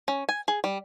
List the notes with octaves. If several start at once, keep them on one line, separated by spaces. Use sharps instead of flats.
C#4
G#5
G#4
G3